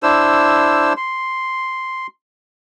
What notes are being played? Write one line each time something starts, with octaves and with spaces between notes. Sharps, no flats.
D4 E4 C5 E6
C6